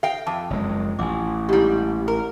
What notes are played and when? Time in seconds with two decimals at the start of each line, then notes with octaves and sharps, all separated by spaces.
0.03 A4 E5 F5 G5
0.27 F2 A5 D6
0.50 F#1 G#3
0.99 A1 G#5 D6
1.49 G#2 G3 E4 G4
2.08 A#4